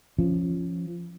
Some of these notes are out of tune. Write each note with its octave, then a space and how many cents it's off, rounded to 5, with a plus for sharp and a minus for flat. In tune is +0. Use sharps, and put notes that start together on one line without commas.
F3 -20 C#4 -10